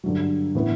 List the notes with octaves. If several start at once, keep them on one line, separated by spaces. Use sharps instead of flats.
G2 D3 F#3
A2 E3 B3